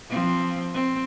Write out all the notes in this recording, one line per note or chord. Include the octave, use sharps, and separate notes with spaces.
F3 C4
C4